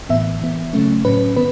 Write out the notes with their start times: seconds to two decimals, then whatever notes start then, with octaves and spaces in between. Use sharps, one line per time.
0.09 A2 E3 B3 E5
0.41 E3 B3
0.73 C#3 F#3 A3 C#4
1.05 A2 F#3 C#4 B4
1.36 D#3 B3 B4